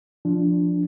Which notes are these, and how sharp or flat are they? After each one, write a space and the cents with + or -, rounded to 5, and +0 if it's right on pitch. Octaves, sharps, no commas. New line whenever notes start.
F3 +0 D4 +0